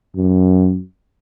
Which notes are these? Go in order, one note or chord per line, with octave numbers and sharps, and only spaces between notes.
F#2